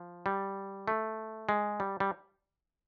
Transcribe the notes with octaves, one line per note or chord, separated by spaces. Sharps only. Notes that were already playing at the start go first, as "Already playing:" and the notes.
Already playing: F3
G3
A3
G#3
G3
G3